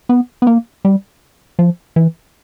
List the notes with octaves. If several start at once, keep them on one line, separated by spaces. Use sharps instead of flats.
B3
B3
A#3
G3
F3
E3